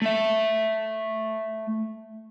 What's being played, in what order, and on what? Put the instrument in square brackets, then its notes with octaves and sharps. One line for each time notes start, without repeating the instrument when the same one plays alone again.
[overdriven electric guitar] A3 E5